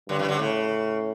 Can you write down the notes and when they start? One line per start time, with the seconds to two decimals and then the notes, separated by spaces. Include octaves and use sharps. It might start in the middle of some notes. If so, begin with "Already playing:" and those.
0.09 G2 D3 F#3
0.19 C#3 E3
0.28 D3 F#3
0.39 A2 C#3